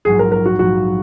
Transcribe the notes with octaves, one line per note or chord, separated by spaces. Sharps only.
A#1 G#2 F#3 G#4
A#4
A#4
F#4
A#1 G#2 F#3 F#4